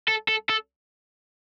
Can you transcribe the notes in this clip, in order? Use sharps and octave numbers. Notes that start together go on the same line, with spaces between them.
A4
A4
A4